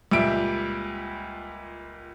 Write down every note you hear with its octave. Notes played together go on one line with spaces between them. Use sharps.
C#2 A#2 G3 E5 D7